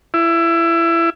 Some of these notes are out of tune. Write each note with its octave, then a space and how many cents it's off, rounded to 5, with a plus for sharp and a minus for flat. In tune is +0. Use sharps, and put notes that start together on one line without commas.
E4 +20